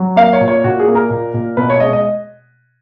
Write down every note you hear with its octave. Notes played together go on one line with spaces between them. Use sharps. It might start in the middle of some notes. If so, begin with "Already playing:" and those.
Already playing: F#3
A#3 F5
C#5
A#2
C#5
A#2 F#4
G#4
A#3
A#4
A#2
A#2
B2 B4
C#5
G#3 D#5
D#5